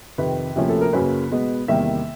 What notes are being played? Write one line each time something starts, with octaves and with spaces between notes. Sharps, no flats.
F2 C3 D#3 B4
D2 C3 F3 A#3 C#4
A4
A#4
F#2 C#3 F#3 A#3 C#4 B4
B2 G#3 B3
E2 C3 D#3 G3 A#3 E5